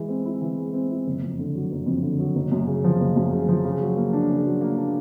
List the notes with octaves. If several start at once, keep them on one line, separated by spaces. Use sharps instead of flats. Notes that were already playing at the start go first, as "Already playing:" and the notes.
Already playing: E3 G#3
C4
E4
E3
G#3
C4
E4
F#1
F2
D3
F#3
F#1
F2
D3
F#3
F#1
F#2
C#3
F3
F#1
F#2
C#3
F3
C#3
F#3
A#3
D4
C#3
F#3
A#3
D4